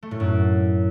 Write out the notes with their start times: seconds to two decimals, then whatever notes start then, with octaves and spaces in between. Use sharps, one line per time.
0.03 A3
0.11 A2
0.20 F#2